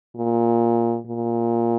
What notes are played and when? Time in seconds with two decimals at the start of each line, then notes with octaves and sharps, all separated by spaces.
0.16 A#2
1.06 A#2